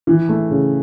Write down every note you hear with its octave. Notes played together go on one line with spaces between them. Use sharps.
E3
A3
C#3